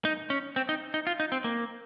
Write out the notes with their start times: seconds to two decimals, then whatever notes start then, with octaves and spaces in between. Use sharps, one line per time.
0.05 D#4
0.30 C#4
0.56 C4
0.69 D#4
0.94 D#4
1.07 F4
1.20 D#4
1.32 C4
1.44 A#3